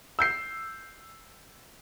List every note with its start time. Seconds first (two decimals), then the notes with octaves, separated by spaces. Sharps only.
0.19 E6 G6 C7